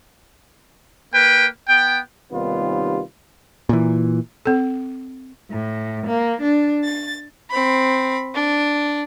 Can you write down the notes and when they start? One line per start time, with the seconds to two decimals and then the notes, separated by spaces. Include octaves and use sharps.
1.14 A#3 B4 G5
1.68 B3 G5
2.31 D#2 C3 D#3 G3 B3 F4
3.69 A#2 E3
4.46 C4 A4
5.50 A2
6.06 A#3
6.41 D4
6.84 A6
7.51 C4 B5
8.34 D4